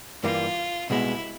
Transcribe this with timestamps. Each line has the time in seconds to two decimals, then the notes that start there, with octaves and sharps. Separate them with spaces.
0.23 G2 E3 G3 A#3 F4
0.89 C2 B2 G#3 E4